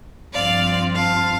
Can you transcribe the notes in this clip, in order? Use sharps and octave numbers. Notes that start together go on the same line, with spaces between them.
G2 F3 C4 F4 D5 F5
F5 A5